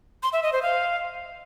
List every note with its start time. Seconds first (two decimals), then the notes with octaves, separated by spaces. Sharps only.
0.23 C6
0.33 E5
0.43 D#5
0.53 C5
0.62 F5